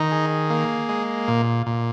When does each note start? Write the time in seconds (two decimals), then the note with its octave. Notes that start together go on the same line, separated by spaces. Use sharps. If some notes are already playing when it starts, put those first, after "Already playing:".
Already playing: D#3 D#4
0.12 G#4
0.50 A#3
0.89 G#3
1.28 A#2
1.66 A#2